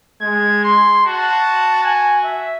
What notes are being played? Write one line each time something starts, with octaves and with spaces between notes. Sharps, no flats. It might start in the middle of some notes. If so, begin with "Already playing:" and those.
G#3 G#6
C6
F#4 A5
G#5
E5